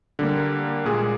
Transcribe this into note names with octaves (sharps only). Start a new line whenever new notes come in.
D3 G3 A#3
A#2 G#3 G#4